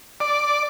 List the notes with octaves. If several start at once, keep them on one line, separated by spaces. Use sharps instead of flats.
D5